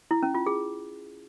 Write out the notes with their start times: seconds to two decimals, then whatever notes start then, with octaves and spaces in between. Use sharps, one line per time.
0.11 E4
0.23 C#4
0.35 F4
0.46 G#4